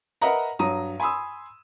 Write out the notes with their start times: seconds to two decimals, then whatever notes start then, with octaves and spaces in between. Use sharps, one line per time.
0.22 A#4 B4 D#5 E5 F#5 A#5
0.59 G2 F#3 A#5 D#6 D#7
1.00 G#5 B5 C6 D#6 E6